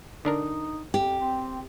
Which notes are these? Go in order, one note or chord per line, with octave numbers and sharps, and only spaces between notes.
D3 D4 D#4 A#4
F2 G4
C4